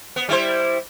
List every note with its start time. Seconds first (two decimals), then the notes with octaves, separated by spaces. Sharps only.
0.16 B3
0.29 G3 E4 C5